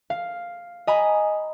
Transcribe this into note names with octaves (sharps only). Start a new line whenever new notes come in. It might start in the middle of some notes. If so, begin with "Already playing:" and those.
F5
D#5 G#5 A#5 B5 D#6